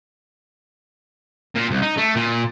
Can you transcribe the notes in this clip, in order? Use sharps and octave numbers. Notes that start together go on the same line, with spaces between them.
A#2
C2
D#4
A3
A#2